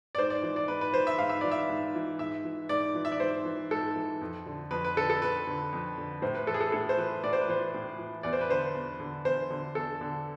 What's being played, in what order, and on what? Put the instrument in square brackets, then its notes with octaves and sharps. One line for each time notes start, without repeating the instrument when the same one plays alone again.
[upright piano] D5
G#2 C5
D5
E3
D5
G#2 B4
B4
E3 C5
E5
G#2 F5
E5
E3 D5
E5
G#2
E3
G#2 E5
E3
G#2 D5
E3
E5
D5
G#2 C5
E3
G#2 A4
E3
F2
D3
F2 B4
B4
D3 A4
A4
F2 B4
D3
F2
D3
A2 C5
B4
E3 A4
G#4
A4
A2 A4
C5
E3 B4
A2 D5
C5
B4
E3 C5
A2
E3
E2 D5
C5
B4
D3 C5
E2
D3
E2 C5
D3
E2 A4
D3